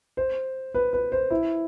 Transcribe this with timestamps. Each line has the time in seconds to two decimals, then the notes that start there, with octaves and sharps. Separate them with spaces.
0.17 C5
0.75 B4
0.93 B4
1.12 C5
1.30 E4